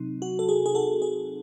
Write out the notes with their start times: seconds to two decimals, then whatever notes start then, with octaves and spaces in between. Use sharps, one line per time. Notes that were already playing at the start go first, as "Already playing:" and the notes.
Already playing: C3 F#3 C4 D#4
0.22 F#4
0.39 A4
0.49 G#4
0.66 G#4
0.75 F#4 A4
1.02 G#4